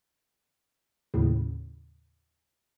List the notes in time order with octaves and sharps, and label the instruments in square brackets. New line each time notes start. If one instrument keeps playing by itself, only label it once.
[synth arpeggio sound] D#2 A2 C#3